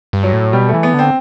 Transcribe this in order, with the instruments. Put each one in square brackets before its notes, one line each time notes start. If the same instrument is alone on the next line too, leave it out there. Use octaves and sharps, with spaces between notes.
[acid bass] G2
[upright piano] F#3
[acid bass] A2
[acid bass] B2 [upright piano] G3
[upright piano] A3
[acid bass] E3
[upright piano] B3
[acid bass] D3 [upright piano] C4